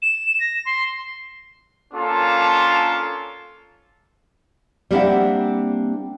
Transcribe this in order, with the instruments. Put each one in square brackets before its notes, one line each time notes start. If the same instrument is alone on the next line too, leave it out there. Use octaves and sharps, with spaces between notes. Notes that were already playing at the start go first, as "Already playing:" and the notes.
[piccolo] E7
A#6
C6
[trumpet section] A#3 C#4 D4 F4 A4
[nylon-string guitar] G3 A#3 C4 D4 E4 F#5